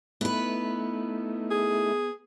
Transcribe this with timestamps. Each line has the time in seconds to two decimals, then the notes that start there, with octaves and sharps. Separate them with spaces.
0.21 A3 B3 D#4 E4 B4
1.51 G#4